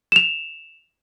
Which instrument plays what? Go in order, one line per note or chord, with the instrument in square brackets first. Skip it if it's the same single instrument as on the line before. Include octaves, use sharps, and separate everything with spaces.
[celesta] E7 F7